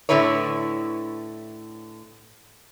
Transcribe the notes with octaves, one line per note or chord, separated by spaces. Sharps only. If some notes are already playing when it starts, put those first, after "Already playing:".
A2 D3 E3 E4 B4 C#5